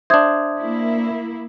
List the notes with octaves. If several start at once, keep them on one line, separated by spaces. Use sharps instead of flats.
D4 C5 E5 D#6 G#6
A#3 E4